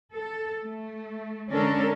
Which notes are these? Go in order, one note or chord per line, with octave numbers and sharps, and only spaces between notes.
A4
A3
D3 G#3 C#4 D4 A4 A#4